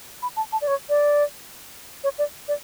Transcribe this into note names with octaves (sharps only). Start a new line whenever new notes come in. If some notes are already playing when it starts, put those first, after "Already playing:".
B5
A5
A5
D5
C#5
D5
C#5
D5
D5